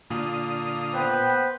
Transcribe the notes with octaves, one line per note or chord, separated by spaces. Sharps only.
A#2 D3 F5 D#6
B3 B4 C5 G5